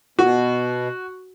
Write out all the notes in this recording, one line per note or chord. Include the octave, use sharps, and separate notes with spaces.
B2 F#4